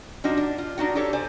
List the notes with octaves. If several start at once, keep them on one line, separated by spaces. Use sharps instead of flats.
F3 D4 D#4 F#4
D4
F4
D4 D#4 F#4 F#5
D4 G4 A4 C#5
C5 D5 G#5